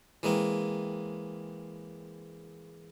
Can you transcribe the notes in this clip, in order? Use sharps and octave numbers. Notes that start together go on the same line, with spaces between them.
E3 G#3 A#3 C4